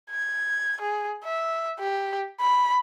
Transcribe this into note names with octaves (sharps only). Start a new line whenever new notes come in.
G#6
G#4
E5
G4
B5